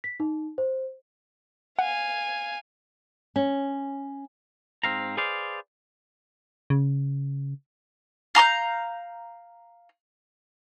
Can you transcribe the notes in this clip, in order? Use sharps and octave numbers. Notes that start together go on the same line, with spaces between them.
B6
D#4
C5
F5 F#5 G#5
C#4
G#2 C4 F5 A#5
G#4 B4 C5 D5 F5
C#3
F5 A#5 D6 G6